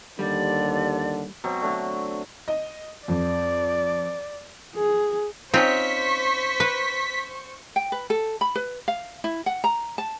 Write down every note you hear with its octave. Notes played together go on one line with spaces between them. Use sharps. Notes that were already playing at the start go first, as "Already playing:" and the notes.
D#2 D3 G3 D5
B2 F#3 C4
D3 F#3 A3
D#5
F2 D5
G#4
C4 C#4 D#4 F4 C5 C#6 B6
B4
G5
B4
A4
B5
B4
F5
E4
F#5
A#5
A5